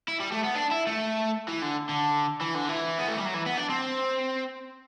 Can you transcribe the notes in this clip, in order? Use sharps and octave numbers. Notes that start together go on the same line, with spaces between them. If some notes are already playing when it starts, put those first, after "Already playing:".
E4
G3
A3
B3
D4
E4
A3
E3
D3
D3
E3
D3
E3
B3
A3
G3
F#3
E3
B3
D4
C4